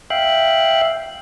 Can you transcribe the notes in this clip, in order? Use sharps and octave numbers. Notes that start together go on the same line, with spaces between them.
E5 F5 G5 F#6